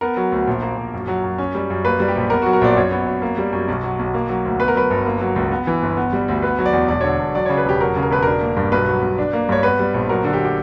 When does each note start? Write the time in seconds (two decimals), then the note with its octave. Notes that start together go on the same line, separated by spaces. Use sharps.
0.01 B3 A#4
0.17 F#3
0.32 D2
0.47 A#1
0.62 A#3
0.77 A#1
0.94 F#2
1.08 F#3
1.24 F#2
1.38 C#4
1.55 G3
1.70 F#2
1.84 A#3 B4
2.00 G3
2.08 G4
2.16 A#1
2.30 B3 A#4
2.42 F#3 F#4
2.53 A#4
2.61 A#1 D5
2.77 F#2 C#5
2.91 B3
3.06 F#2
3.22 A#3
3.38 G3
3.53 F#2
3.68 B1
3.83 F#3
3.99 B1
4.14 A#3
4.29 F#3
4.45 D2
4.60 B3 B4
4.68 A#4
4.74 F#3 B4
4.91 G1
5.06 A#3
5.21 F#3
5.36 C#2
5.51 B3
5.67 E3
5.82 G1
5.97 B3
6.13 G3
6.28 D2
6.42 B3 B4
6.59 F#3
6.66 D5
6.73 E2
6.88 E1 D5
7.01 D3 C#5
7.19 E1
7.35 F#3 D5
7.45 C#3 C#5
7.57 B4
7.65 E1 G4
7.80 F#3 A#4
7.96 C#3
8.03 A#4
8.10 E1 B4
8.23 D4 A#4
8.41 A#3
8.56 G2
8.72 B1 B4
8.87 F#3
9.02 B1
9.18 D4
9.33 A#3
9.49 G2 C#5
9.63 B3 B4
9.79 G3
9.94 A#1
10.09 F#3 A#4
10.24 D3
10.33 G4
10.45 G4